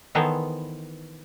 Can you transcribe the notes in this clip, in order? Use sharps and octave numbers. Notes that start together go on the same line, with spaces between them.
D#3 E3 B3 A4 C5 C#5